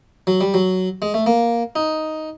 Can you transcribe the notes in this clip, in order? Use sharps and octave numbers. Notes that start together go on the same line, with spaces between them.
F#3
G3
F#3
G#3
A3
A#3
D#4